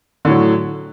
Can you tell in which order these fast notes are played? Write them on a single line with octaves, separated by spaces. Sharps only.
D3 A2 F#3